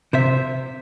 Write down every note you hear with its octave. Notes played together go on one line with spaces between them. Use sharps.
C3 C5 E5